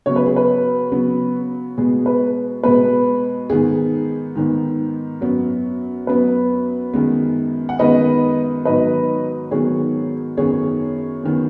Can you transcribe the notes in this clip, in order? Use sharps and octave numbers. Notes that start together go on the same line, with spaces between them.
C#3 F#3 B3 C#5
B4
G#4
B4
C#3 F#3 B3
B2 G#3 B3 G#4
B4
B2 G#3 B3 B4
G#2 D#3 B3 G#4
G#2 D#3 B3
F#2 F#3 B3
F#2 F#3 B3 B4
F#2 D#3 G#3 B3
F#5
F#2 D#3 G#3 B3 B4 D#5
G#2 D#3 F#3 B3 B4 D#5
G#2 D#3 F#3 B3 G#4 C#5
F#2 D#3 B3 G#4 C#5
F#2 D#3 B3